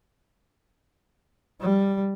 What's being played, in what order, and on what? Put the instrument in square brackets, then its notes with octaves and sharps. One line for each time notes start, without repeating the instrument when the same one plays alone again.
[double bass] G3